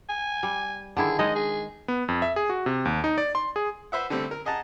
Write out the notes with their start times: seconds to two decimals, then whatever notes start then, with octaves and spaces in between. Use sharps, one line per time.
0.09 G#5
0.43 G3
0.97 D3 D#3 E4 G#4
1.19 G#3 D#4 D#5
1.35 G#4
1.88 B3
2.08 F2
2.22 E5
2.36 G#4
2.50 F#4
2.66 C3
2.85 D#2
3.04 D#4
3.18 D5
3.35 C6
3.56 G#4
3.92 B4 C5 E5 F#5
4.10 D3 G3 A3 C4
4.31 A#4
4.45 G#4 D#5 F#5 A5 A#5